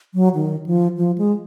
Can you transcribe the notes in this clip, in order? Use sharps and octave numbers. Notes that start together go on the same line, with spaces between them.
F#3
D#3
F3
F3
G#3